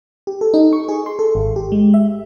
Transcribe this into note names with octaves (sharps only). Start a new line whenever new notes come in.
G4
A4
D#4
C#6
G#4
C6
A4
G#1
G4
G#3
E5